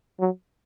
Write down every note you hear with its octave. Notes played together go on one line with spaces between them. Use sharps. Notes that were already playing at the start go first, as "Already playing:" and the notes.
F#3